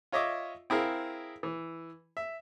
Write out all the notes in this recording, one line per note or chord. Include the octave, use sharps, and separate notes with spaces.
F4 C#5 D#5 E5 D6
C4 E4 G#4 A#4 F5
E3
E5